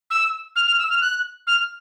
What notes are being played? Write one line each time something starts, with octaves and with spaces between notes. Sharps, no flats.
E6
F6
F6
E6
F6
F#6
F6